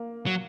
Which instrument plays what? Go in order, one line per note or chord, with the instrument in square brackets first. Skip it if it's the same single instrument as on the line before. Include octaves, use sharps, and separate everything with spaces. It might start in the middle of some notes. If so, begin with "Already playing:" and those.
Already playing: [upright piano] A#3
[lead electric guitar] F#3